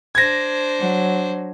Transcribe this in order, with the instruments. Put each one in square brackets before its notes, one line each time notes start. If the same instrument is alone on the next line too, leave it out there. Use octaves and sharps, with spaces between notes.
[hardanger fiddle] D4 C5 [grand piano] G#6 A#6
[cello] F#3